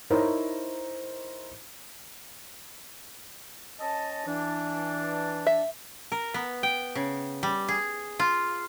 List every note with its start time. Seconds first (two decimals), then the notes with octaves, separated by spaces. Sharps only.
0.10 D#4 E4 A#4 C5 C#5
3.80 C#4 D#5 A5
4.26 E3 D4
5.47 E5
6.12 A#4
6.34 B3
6.63 G5
6.95 C#3
7.43 G3
7.68 G#4
8.19 F4